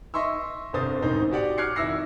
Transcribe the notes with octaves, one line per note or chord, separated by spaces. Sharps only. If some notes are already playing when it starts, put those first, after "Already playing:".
D#5 E5 C6 C#6 E6
G1 C2 C5 D#6 A6
A1 G#2 D#4 C5
F#4 G4 D5 F#5
D6 F6 F#6 G#6 C7 C#7
G#1 E4 E6 A#6 C7